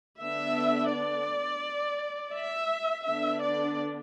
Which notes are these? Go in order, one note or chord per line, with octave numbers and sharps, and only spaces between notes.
D3 B3 D4 E5
D5
E5
D3 B3 D4 E5
D5